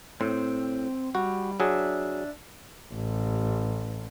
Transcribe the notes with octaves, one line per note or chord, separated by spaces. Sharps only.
A2 C4
G3 F#4
F#3 D4 G#4 E5
A1